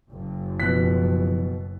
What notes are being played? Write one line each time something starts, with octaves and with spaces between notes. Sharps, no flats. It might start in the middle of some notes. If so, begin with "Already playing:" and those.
F#1
B2 F3 F#6 B6